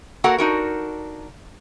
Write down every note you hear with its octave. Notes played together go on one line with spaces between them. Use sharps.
A#3 F#4 A4 A#4 F#5
D4 D#4 F#4 A#4